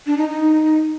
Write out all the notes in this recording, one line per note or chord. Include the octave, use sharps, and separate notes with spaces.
D4
D#4
D#4